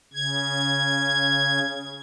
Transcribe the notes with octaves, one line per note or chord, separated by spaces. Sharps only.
C#3 G#6